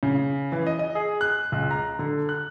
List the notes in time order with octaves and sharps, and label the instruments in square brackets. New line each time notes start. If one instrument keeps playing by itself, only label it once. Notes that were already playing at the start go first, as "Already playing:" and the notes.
[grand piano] C#3
E3
D#5
D#5
G#4
F#6
C#2
A#5
D3
F#6